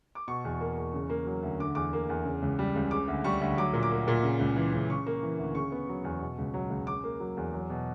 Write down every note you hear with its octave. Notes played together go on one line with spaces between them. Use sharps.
D6
B2 C#6
E2
A#3
E2
C#3
A#3
F#3
D2
D3 D6
E2 D6
A#3
E2
C#3
C#2
G3
C#2
C#3 D6
D2
G3 C#6
D2
F#3 D6
A#2
D6
A#3
A#2
C#3
C#2
E3
C#2
C#3 C#6
A#3
E3
D2
C#3 C#6
B3
F#3
E2
B2
C#2
F#3
C#2
C#3 D6
A#3
F#3
E2
F#3
B2